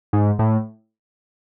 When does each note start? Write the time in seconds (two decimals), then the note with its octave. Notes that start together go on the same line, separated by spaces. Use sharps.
0.13 G#2
0.39 A2